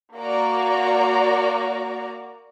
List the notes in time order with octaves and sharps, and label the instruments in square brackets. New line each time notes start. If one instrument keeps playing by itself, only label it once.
[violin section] A#3 F#4 D5 A#5